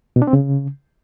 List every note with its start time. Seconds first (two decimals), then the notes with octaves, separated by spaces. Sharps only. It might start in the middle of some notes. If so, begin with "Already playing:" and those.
0.16 B2
0.22 D4
0.27 C4
0.33 C#3